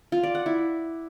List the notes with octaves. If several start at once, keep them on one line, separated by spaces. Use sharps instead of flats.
F4
D5
F#5
E4